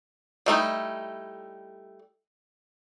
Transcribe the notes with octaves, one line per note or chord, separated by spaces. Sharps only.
G3 A3 D#4 E4